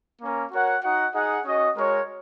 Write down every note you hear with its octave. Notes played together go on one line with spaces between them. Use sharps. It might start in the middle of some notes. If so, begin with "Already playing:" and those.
A#3 C#4 A#4
F#4 A#4 C#5 F#5
D#4 F#4 D#5 F#5
D#4 G#4 D#5 F#5
C#4 F#4 D#5
G#3 F#4 A#4 C#5